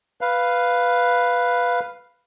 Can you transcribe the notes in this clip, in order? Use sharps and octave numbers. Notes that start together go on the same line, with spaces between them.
B4 F5